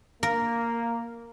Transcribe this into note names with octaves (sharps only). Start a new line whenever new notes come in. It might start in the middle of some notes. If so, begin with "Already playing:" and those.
A#3 A#4